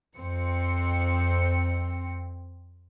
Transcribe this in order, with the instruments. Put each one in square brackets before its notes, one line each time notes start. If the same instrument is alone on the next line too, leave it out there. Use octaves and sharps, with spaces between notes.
[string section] F2 C4 C#7